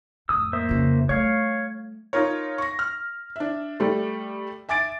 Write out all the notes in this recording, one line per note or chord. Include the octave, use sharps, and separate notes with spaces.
F2 A2 D#6 E6
A#3 C5 E5
F2 C#3
G3 A3 C#5 F5
D#4 F4 A#4 C#5
C#6 A#6
F6
D4 E5
G3 A3
E5 G#5 D6 A6 D7